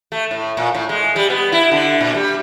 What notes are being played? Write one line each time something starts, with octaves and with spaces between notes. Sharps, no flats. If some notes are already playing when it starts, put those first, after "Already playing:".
A3
A2
A#2
A2
G#3
G3
B3
E4
D3
A#2
G3